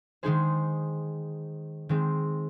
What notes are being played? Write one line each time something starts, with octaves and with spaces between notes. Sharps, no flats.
D#3 G#3 D#4 G#4 C5
D#3 G#3 C4